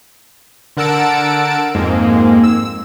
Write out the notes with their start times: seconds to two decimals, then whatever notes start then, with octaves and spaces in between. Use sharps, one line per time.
0.77 D3 A#4 F#5 A5 E6 D7
1.75 F2 G#2 G#3 A#3
2.43 E6